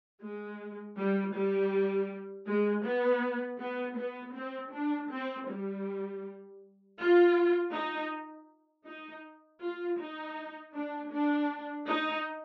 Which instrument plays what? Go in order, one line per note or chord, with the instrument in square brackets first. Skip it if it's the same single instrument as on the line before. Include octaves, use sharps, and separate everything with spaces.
[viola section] G#3
G3
G3
G#3
B3
B3
B3
C4
D4
C4
G3
F4
D#4
D#4
F4
D#4
D4
D4
D#4